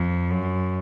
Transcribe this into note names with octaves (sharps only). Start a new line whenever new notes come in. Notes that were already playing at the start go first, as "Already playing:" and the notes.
Already playing: F2
F#2